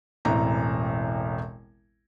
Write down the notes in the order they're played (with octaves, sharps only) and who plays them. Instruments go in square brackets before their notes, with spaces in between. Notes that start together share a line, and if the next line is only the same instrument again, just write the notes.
[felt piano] E1 A1 E3 C4 A#5